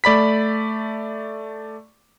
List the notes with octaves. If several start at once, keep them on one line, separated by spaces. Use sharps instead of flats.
A3 D5 B5 B6